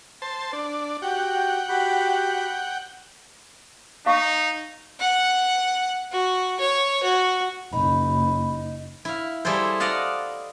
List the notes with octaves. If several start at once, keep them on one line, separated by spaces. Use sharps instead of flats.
C5 A5
D4
F#4 G4 F#5 G5
F#4 G4 B5
D#4 F5 C#6
F#5
F#4
C#5
F#4
F#1 D#4 B5
E4 F5
G3 E4 G#4 A4 C5
D5 D#5 F5 F#5 A5